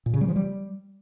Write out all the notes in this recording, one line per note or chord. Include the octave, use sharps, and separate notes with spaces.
A#2
C#3
G3
F3
G3